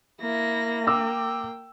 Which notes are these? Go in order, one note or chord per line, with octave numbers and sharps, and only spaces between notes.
A#3 E4 A#6
G5 D6 E6